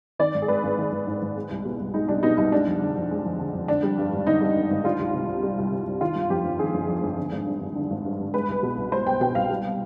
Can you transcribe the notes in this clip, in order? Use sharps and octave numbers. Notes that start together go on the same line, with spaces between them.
D#3 D5
G#1
G#4
G#2 B4
G#1
D#3
G#1
G#2
G#1
G#3
C2
B2
C2
G#3 D#4
C2 D4
B2 D#4
C2 D#4
G#3 D4
F2
D3
F2
G#3
F2
D3
F2
D3 D4
G3
G2
G#1
D3 D#4
G3
G2
G#1
G3 F4
C2
C3
C2
G3
C2
C3
C2
D#3 F4
G1
F2 G4
G1
D#3 G#4
G1
F2
G1
D3
G#1
G2
G#1
D3
G#1
G2
G#1
G#3 B4
C2
B2
C2
G#3 C5
C2 G5
B2 G5
C2 F5
G3